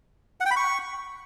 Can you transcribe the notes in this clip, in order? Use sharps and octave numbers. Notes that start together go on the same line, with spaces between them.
F#5
G5
B5
C#6